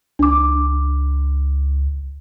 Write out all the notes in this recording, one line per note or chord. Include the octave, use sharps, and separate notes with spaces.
C#2 D4 D6